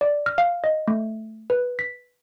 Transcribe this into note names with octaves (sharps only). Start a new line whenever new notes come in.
D5
F6
F5
D#5
A3
B4
B6